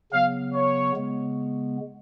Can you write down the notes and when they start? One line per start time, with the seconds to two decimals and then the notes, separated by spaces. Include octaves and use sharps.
0.11 C#3 F#3 B3 F5
0.54 C#5
0.96 C#3 G#3 B3